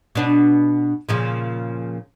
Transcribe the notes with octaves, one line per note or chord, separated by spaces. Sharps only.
B2 D4
A#2 C#3 F3